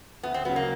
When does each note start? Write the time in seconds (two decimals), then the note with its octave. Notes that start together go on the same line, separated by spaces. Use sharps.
0.23 D2 B3
0.34 C4
0.45 C#3 F#3 B3
0.56 A#3